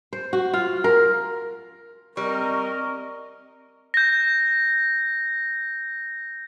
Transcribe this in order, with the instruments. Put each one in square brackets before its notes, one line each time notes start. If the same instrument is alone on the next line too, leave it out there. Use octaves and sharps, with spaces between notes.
[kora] C5
F#4
F4
A#4
[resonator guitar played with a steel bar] G3 [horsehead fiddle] C4 D#5 [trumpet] A#4 [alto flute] C#6
[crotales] G6 A#6